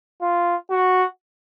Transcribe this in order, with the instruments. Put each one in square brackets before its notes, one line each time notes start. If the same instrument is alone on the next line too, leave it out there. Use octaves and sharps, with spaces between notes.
[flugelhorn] F4
F#4